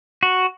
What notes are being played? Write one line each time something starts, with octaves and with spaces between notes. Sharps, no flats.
F#4